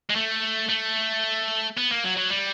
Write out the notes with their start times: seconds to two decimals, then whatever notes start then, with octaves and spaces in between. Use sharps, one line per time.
0.10 G#3
0.15 A3
0.70 A3
1.77 B3
1.91 A#3
2.04 F#3
2.17 F#3
2.30 G3